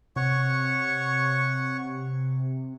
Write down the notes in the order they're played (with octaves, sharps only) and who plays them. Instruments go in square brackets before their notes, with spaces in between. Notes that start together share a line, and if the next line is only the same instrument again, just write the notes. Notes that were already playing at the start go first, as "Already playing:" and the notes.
[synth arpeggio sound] C3 [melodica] C#5 F#5 C#6